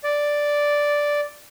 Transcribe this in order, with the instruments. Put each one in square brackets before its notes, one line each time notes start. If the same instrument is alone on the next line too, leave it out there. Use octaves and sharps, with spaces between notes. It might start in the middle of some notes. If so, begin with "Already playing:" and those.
[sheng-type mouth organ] D5